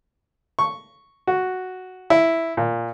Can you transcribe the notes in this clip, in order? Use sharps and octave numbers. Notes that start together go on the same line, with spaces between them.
C#6
F#4
E4
A#2